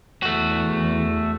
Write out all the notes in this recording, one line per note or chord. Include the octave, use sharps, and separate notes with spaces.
E2 A3 F#4